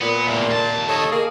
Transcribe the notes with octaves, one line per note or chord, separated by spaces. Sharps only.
A#2 B3
E2 A2
D#2 A5
A4 C#5 D#5
A#3 G#4